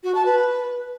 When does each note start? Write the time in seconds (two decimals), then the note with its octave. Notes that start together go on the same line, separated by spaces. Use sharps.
0.04 F#4
0.15 A5
0.26 B4